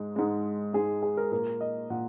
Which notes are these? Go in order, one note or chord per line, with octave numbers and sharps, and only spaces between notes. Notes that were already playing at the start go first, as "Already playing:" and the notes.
Already playing: G#2 G#3
G#2 G#3
G#2 G#3 G#4
G#4
A#4
A#2 A#3 A#4
D#5
A#2 F#5